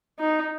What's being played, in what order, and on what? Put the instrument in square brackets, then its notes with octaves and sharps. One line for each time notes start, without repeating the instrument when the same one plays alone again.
[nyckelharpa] D#4